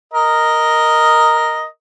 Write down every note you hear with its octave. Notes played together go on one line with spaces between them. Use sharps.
A#4 D#5